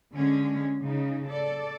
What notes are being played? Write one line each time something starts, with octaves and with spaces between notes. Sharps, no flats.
D3 G#3 C#4
C#3 D#4
A4 D5